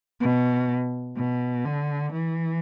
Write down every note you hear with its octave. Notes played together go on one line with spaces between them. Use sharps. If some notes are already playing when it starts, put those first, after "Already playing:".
B2
B2
D3
E3